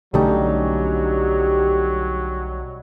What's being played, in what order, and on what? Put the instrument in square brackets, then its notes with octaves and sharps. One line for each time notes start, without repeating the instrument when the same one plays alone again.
[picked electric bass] B1 D3 A3 [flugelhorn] F#3 [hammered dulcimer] G3 C#4 D#4 [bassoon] G4